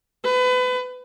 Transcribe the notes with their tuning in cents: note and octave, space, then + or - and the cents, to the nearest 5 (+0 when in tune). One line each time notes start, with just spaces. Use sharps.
B4 +30